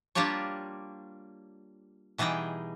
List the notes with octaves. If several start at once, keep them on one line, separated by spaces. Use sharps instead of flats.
G3 A#3 D4 F4 G4 C#5
B2 E3 G3 D#4 G#4 G5